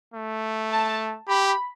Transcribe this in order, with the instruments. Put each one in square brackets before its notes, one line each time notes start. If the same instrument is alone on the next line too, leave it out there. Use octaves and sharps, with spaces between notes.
[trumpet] A3
[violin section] A5
[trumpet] G4 [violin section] B5